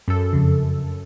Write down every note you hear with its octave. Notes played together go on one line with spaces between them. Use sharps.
F#2 A4
F2 C#3